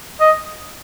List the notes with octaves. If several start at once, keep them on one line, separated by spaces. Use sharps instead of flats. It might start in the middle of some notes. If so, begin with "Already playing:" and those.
D#5